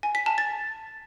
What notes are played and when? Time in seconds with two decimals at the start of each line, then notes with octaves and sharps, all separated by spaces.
0.03 G#5
0.15 B6
0.26 A5
0.38 A6